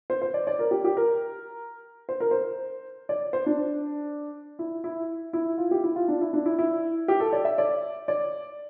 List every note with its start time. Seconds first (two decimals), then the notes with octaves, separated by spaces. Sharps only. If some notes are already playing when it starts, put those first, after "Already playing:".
0.10 C5
0.22 C5
0.34 D5
0.47 D5
0.59 A#4
0.71 G4
0.84 G4
0.97 A#4
2.09 C5
2.20 A#4
2.31 C5
3.09 D5
3.33 C5
3.46 D4
4.59 E4
4.84 E4
5.33 E4
5.58 F4
5.71 G4
5.84 E4
5.96 F4
6.08 D4
6.21 E4
6.33 D4
6.46 E4
6.58 E4
7.08 G4
7.20 A4
7.33 D5
7.45 E5
7.58 D5
8.08 D5